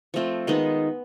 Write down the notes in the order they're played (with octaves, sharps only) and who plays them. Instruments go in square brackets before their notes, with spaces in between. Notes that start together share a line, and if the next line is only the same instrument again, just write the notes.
[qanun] F3 A3 C4 F4
D#3 G#3 B3 D#4